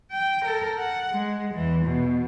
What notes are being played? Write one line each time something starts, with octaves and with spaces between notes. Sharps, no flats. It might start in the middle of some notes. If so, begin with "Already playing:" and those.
G5
A4 A#4
F#5
G#3
E2 E3
B2